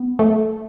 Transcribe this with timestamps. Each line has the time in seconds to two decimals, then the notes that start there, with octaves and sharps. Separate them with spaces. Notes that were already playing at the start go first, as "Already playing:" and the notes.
Already playing: B3
0.19 A3